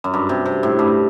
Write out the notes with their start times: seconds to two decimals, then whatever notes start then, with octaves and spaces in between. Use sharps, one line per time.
0.04 F#2
0.14 G2
0.29 C3
0.46 C3
0.63 A2
0.79 G2